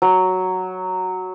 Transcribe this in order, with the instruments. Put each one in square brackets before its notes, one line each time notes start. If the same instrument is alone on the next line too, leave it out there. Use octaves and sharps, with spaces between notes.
[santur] F#3